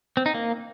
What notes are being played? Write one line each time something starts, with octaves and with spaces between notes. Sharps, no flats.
C4
D#4
A#3